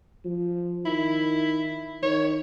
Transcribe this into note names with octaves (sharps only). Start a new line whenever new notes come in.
F3
D#3 E4
D#3 C#5